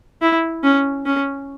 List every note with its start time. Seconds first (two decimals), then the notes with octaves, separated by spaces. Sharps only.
0.22 E4
0.64 C#4
1.06 C#4